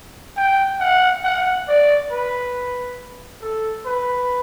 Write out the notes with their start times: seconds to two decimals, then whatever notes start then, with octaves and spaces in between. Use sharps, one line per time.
0.37 G5
0.80 F#5
1.24 F#5
1.68 D5
2.11 B4
3.42 A4
3.86 B4